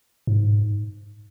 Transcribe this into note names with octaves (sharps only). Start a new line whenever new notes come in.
G#2